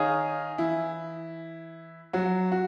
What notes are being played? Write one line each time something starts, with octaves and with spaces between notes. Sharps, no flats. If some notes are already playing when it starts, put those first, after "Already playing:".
Already playing: D#3 D#4 G#4 C#5 F5
E3 E4
F#3 F#4
F#4